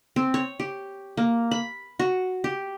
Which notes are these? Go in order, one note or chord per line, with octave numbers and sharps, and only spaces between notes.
C4
C#5
G4
A#3
B5
F#4
G4